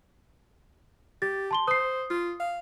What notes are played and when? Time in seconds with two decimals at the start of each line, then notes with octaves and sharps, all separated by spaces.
1.22 G4 A6
1.51 A5 C6 G7
1.67 C5 D#6 C7
2.10 F4
2.40 F5